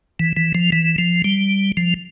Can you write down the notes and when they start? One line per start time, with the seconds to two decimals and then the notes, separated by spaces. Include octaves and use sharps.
0.19 E3
0.37 E3
0.55 F3
0.72 E3
0.98 F3
1.24 G3
1.77 F3